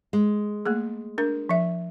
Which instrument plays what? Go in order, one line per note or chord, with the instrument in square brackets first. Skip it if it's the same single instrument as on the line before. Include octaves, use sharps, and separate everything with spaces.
[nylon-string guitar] G#3
[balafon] A3 A#3 G#4
D4 A#4
F3 E5